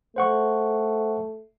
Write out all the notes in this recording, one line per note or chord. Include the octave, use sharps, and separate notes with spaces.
A3 C5 F#5 C#6